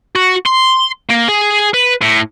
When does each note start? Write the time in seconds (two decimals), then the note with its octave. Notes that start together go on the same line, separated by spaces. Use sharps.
0.15 F#4
0.46 C6
1.10 A#3
1.29 G#4
1.74 B4
2.01 A2